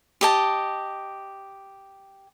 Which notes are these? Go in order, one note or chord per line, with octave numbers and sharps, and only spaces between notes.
G4 D#5 A5